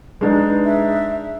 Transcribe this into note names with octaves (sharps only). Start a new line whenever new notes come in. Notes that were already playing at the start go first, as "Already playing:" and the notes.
G#3 D4 D#4 B4
E5